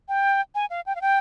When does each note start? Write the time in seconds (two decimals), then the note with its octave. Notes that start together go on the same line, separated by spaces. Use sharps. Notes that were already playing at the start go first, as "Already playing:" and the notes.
0.09 G5
0.55 G#5
0.70 F5
0.86 G5
0.95 F5
1.01 G5